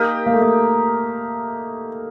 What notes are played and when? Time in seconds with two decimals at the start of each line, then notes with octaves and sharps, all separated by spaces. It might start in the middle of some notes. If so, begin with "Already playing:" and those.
Already playing: A#3 D#4 G4 A#4 D#5
0.26 A#3
0.34 A3
0.42 A#3